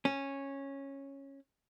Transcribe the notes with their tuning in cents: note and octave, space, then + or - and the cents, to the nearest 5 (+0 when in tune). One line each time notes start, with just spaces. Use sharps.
C#4 -10